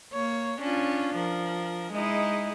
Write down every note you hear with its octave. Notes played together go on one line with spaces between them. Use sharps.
A#3 C#5
C#4 D4 F4
F3 A#4
G#3 D#4 E4